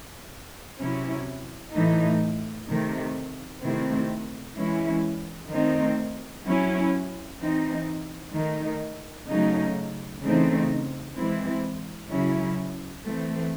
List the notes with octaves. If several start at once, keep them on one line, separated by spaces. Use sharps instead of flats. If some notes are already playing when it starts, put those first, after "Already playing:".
C3 F#3 C#4 E4
A2 E3 A3 D#4
C3 D#3 A3
C3 D#3 A3 C4 E4
E3 G#3 C#4 E4
D#3 A3 C4 D#4
F#3 C#4 E4
E3 C4 D#4
D#3 A3 D#4
C#3 F#3 A3 D#4
C#3 E3 A3 C4 D#4
E3 G#3 C4 E4
C#3 F#3 C#4 E4
E3 A3 C4